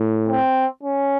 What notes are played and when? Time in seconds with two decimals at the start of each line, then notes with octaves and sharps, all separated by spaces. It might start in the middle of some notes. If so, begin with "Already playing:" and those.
Already playing: A2
0.28 C4
0.83 C#4